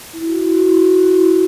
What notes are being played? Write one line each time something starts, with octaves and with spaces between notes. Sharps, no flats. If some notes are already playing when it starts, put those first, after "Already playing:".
E4
F#4
E4
F#4
E4
F#4
E4
F#4
E4
F#4